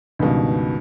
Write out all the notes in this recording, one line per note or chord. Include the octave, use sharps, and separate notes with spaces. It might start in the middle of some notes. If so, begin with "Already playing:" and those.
C#2 G2 B2 D#3